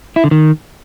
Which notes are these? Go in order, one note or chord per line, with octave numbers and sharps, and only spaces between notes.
E4
D3
D#3